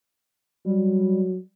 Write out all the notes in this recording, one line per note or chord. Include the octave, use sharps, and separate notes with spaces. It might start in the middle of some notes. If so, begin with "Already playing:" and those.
F#3 G3